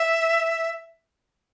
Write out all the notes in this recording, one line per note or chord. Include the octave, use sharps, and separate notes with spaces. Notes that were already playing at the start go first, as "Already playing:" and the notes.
Already playing: E5